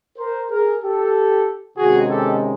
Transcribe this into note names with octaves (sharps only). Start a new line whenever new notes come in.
A#4 C5
G#4 A#4
G4 A4
C3 D#3 G#3 C#4 F#4 G#4
G4 A4